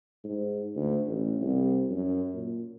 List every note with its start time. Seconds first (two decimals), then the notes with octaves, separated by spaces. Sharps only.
0.24 G#2
0.76 D2
1.06 A1
1.41 C2
1.90 F#2
2.34 A#2